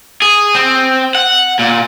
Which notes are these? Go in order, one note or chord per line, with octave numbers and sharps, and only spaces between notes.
G#4
C4
F#5
A#2